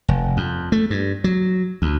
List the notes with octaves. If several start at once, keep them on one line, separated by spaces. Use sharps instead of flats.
F1
F2
A3
G2
F#3
D2